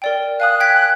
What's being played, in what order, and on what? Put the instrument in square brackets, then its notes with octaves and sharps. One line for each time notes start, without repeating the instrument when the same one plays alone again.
[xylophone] A#4 D5 G5
[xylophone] F5 G#5 D#6 [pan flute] F#6
[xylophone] G5 G#6 B6